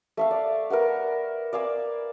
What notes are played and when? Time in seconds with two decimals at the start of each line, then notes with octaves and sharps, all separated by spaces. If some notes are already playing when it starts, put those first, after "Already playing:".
0.17 A3 E5 F5
0.31 D5
0.70 A#4 B4 E5 F#5
1.53 D5 F5 G#5 E6